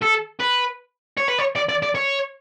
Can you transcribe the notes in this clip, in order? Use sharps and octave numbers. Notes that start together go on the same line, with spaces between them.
A4
B4
C#5
B4
C#5
D5
D5
D5
C#5